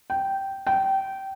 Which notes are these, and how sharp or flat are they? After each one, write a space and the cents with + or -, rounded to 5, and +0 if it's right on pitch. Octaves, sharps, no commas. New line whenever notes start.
G5 -10
G5 -20